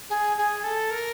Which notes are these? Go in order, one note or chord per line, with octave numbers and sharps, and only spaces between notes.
G#4
G#4
A4
A#4